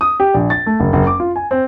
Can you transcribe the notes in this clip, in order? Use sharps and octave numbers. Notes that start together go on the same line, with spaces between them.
D#6
G4
A#1
A6
A3
F#1
F#1
D6
F4
G#5
C4